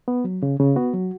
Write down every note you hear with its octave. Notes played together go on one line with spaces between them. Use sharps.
B3
F#3
C#3
C#3
B3 F#4
F#3